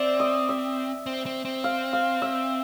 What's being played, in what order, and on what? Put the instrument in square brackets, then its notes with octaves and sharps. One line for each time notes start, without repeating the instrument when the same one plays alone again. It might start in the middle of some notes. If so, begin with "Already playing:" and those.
Already playing: [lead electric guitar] C4 [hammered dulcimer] D5 E5
[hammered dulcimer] D#5
E5
[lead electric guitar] C4
C4
C4
[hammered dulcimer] F5
F5
E5